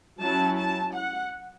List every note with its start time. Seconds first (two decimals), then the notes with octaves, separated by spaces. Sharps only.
0.20 F#3 C#4 E4 A5
0.57 A5
0.94 F#5